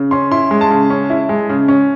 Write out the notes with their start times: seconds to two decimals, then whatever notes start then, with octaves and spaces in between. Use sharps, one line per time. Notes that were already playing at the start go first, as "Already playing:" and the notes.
Already playing: C#3
0.11 C#4 C6
0.31 E4 C6
0.51 G#3
0.61 A5
0.70 C#3
0.90 C#4
1.10 E4
1.29 G#3
1.49 C#3
1.68 C#4